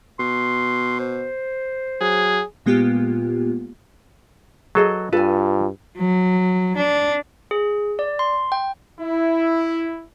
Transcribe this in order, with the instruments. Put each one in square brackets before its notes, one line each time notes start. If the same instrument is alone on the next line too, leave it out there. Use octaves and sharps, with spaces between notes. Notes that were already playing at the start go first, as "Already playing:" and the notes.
[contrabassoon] B2 [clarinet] C6
[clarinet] C5
[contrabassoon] F#3 [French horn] G#4
[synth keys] A#2 G#3 A#3 B3 F4 G4
[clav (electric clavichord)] F#3 A4 [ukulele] G#4 B4 D#5
[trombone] G2 [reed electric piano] F4 [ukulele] A4 G#5 [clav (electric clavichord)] B4
[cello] F#3
D4
[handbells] G#4
D5
C6
G5
[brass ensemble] E4